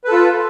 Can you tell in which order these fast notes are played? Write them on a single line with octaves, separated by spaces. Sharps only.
B4 A4 F4